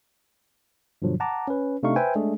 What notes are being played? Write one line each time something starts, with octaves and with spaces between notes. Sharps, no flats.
G2 B2 D3 F3 F#3
F#5 A5 A#5 D6
C#4 B4
C3 A3 D4 D#4 F5 C#6
B4 C5 E5 G5 G#5
G#3 A3 D4 G#4